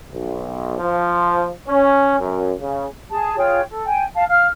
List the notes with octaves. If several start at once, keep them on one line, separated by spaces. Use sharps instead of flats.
B1
F3
C#4
F#2
C#3
G#4 A5
F4 G#4 C#5 G5
A4
G5 G#5
F5 A5
F5 F6